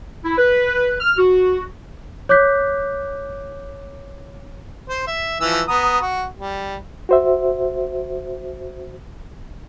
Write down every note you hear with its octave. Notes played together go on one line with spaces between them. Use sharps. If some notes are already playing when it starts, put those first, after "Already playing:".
E4
B4
F6
F#4
C#5 D6 F#6 G6 B6
C5
E5
E3 F3 E6
B3 A#5 D#6
F#4
G3
F#4 C5 E5